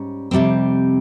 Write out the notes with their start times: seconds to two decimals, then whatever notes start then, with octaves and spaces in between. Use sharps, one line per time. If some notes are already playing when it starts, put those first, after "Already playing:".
Already playing: G#2 G3 C#4
0.31 F2 C3 G3 C4